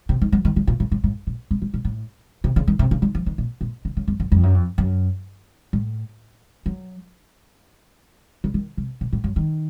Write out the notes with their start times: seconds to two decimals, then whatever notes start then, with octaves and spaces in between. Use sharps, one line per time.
0.09 C3
0.22 D#3
0.32 F#3
0.45 D#3
0.56 C#3
0.67 A#2
0.80 A2
0.92 A2
1.04 A2
1.27 A#2
1.51 A2
1.62 A2
1.74 A#2
1.85 A2
2.44 C3
2.56 C#3
2.68 D#3
2.79 C3
2.91 C#3
3.02 D#3
3.15 F3
3.26 D#3
3.38 A#2
3.61 A#2
3.85 C#3
3.97 C#3
4.08 F2
4.20 F#2
4.32 F2
4.43 F#2
4.54 F2
4.78 F#2
5.73 A2
6.66 F#3
8.44 C#3
8.54 D#3
8.77 C3
9.01 A#2
9.13 A2
9.24 F#2
9.36 D#3